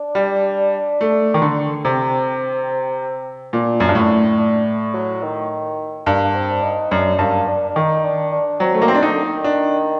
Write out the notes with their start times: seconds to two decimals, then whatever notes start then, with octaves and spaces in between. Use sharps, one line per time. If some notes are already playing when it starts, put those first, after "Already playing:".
Already playing: D4
0.15 G3
1.01 A3
1.34 D#3
1.42 D3
1.84 C3 C4
3.53 A#2 D4
3.80 F#2
3.89 G2
3.95 A2
4.38 D4
4.94 F#3
5.23 D#3
6.06 G2 A#3
6.35 C4
6.63 D#4
6.91 F#2 D4
7.19 G2 A#3
7.47 D4
7.69 D4
7.75 D#3 D#4
8.04 D4
8.32 D4
8.60 F#3 C4
8.74 A3
8.82 D#3 A#3
8.88 C4
8.95 D4
9.02 D3 D#4
9.13 D3
9.23 D#3
9.44 D4